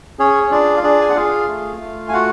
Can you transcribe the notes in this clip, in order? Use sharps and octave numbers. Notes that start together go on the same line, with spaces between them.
C#4 G#4 C#5
C#5
D4 F4 D5
F5
D4 G#4 D5
G#5
F#5
F4 G#4 F5
A3
A3
G#5
F4 F#4 F#5